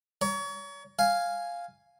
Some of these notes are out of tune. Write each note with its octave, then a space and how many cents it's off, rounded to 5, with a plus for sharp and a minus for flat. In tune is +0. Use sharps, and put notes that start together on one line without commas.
C#5 +35 A#5 +0
F5 +0 G#5 +0